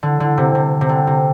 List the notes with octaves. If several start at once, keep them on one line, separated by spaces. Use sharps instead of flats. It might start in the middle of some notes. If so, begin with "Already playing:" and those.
D3
D3
C3
C3
C3
D3
C3